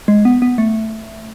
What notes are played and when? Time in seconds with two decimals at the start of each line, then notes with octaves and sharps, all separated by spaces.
0.08 G#3
0.25 B3
0.42 B3
0.58 A3